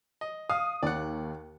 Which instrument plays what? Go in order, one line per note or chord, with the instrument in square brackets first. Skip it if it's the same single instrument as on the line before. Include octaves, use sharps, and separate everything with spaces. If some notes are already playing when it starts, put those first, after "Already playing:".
[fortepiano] D#5
[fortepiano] F5 [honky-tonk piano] D#6
[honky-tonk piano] D#2 [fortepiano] D5 F#5